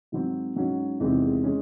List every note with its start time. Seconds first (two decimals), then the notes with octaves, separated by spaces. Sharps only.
0.12 G#2 F#3 C4
0.56 G#2 F#3 C#4 F#4
1.00 E2 C3 D#3 G#3 C4
1.44 G#3 C#4